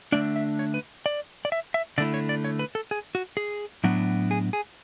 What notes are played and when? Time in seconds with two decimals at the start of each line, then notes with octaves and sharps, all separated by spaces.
0.12 D3 A3 D4 D5
0.36 E5
0.59 C#5
0.74 B4
1.06 D5
1.45 D5
1.52 E5
1.74 E5
1.98 D3 A3 E4 D5
2.14 C#5
2.29 D5
2.44 C#5
2.59 B4
2.75 A4
2.91 G#4
3.15 F#4
3.37 G#4
3.84 A2 F#3 B3 D4
4.31 G#4
4.53 G#4